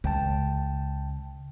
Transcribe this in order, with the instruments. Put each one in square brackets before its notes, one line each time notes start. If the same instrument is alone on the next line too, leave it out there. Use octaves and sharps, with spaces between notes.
[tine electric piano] C#2 G5 A5 [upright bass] C#3